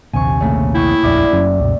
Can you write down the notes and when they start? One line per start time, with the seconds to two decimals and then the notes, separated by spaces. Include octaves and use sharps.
0.13 A#1 D#2 C3 G#5 C#6
0.40 C#3 A3 A#3
0.75 E4 G5 C#6 D#6
1.03 D#1 A#1 F2 D5 E5 D6
1.32 F#1 F#2 C#4
1.60 C#2 F#2 B2